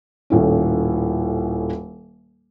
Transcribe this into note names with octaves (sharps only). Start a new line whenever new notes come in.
D#1 A2 C#4